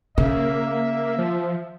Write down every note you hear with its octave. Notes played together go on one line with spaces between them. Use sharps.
C#3 A#3 E5
F3